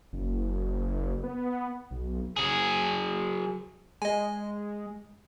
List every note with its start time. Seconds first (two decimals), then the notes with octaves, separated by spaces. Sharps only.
0.13 F#1
1.23 B3
1.91 B1
2.37 F#3 G#4
4.02 G#3 D#5 G#5